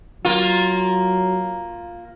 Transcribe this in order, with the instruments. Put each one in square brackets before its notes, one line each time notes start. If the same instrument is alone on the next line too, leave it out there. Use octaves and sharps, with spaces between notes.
[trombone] F#3 [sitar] A#3 F4